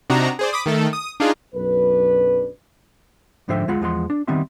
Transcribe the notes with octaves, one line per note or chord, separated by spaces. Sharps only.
C3 D4 D#4 F#4 A#5
G#4 C5 D5
B5 D6 D#6
D#3 A3 A4
D#6
D4 D#4 F4 G#4
B1 F#2 D4 B4
G#2 D3 F3 C5 E5 G5
D2 G#3 F4 F#5 B5
E2 F3 G#3 F#5 C6
D4
D#3 G3 B3 C4 E5 C6